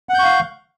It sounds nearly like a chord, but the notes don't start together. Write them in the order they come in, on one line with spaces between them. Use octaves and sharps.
F#5 G6 C#6 F5